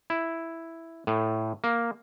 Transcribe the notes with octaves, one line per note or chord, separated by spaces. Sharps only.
E4
A2
A#3